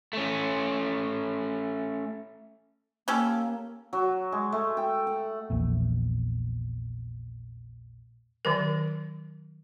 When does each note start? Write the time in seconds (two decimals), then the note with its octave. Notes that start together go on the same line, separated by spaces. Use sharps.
0.13 A3 C#4
3.08 A#3 C#4 G4 A4
3.93 F#3
4.32 G#3
4.52 A3
4.77 G5
5.07 F#5
5.50 A#1 E2 A#2
8.45 D#3 F#3 A#4